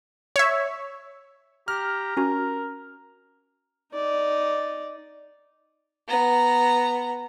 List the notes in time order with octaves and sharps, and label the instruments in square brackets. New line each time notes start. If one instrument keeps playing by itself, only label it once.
[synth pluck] C#5 E5
[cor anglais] G4 [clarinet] A#5 [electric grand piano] F6
[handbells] C#4 F#4 [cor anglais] A#4
[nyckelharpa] D#4 D5
[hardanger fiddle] B3 A#5